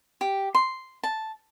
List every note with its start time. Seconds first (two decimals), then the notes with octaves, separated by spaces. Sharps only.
0.21 G4
0.55 C6
1.03 A5